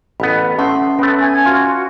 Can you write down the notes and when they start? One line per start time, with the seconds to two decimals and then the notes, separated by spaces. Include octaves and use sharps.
0.20 A1 B3 B5
0.58 A3 C#4 F#5 C6
0.99 A3 B3 C#4 B5
1.19 G#5 G#6
1.45 F4 F#4